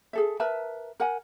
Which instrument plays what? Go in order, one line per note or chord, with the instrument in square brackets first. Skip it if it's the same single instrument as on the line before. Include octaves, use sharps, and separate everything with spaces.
[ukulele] G#4 A4 E5
A#4 B4 E5 A5
A#4 F#5 G#5